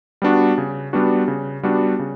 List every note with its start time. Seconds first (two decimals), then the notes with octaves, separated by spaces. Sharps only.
0.22 G3 B3 D4 F#4
0.58 C#3
0.93 G3 B3 D4 F#4
1.28 C#3
1.63 G3 B3 D4 F#4
1.99 C#3